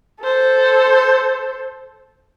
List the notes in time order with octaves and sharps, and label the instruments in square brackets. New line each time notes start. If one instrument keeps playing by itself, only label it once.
[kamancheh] A4 C5